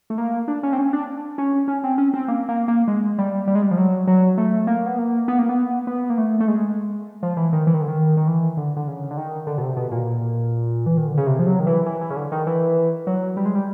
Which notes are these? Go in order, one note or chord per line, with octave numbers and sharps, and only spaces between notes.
A3
A#3
D4
C#4
C4
C#4
D4
C#4
C#4
C4
C#4
C4
A#3
A#3
A#3
G#3
G3
G3
G#3
G3
F3
F#3
F#3
A3
A#3
B3
A#3
B3
A#3
B3
B3
A#3
A3
A3
G#3
F3
E3
D#3
E3
D#3
D3
D#3
D#3
E3
D3
D3
C#3
D3
D#3
D3
B2
C3
B2
A#2
E3
D#3
D3
C#3
C3
F3
F#3
D#3
E3
E3
E3
C#3
D3
D#3
E3
F#3
G3
G#3
G3